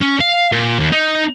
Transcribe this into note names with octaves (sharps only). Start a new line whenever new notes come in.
C#4
F5
A#2
D#2
D#4